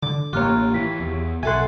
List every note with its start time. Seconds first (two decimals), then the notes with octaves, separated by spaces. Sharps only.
0.03 D3 D6
0.33 A1 A#3 F4 G4 C#5 A#5 F6 F#6
0.74 E3 B6
1.00 E2
1.43 B1 F#4 A4 E5 F#5 G#5 C6 F#6